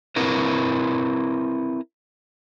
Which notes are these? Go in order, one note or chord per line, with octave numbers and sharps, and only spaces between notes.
C4 E4 A#4 B4